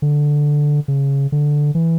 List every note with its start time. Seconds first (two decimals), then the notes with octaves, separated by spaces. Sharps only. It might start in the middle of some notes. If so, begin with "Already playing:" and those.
0.02 D3
0.88 C#3
1.32 D3
1.75 E3